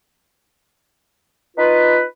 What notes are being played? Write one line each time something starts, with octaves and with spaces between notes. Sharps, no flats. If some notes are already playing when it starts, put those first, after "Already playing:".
D#4 F4 B4